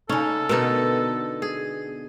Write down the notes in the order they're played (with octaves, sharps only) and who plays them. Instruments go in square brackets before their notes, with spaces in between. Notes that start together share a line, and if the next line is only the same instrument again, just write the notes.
[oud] C#3 D#4 [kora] C#4 [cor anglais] A4
[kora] B2 D3 D#4 [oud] B3 A#4
[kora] G#4